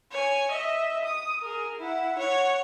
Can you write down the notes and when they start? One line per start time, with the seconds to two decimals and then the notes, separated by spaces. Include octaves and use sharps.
0.11 C#5 G#5
0.51 D#5 E5
1.05 D#6
1.42 G#4 A#4
1.79 E4 F#5
2.19 C#5 F#5